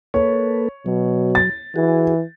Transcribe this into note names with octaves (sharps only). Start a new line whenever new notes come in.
A#3 A4 B4 C#5
B2 F#3
A6
E3 F#4 G#4